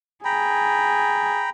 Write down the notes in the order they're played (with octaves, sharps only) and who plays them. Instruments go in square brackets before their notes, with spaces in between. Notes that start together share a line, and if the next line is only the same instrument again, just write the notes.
[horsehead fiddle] G#4 [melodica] G5 A#5 B5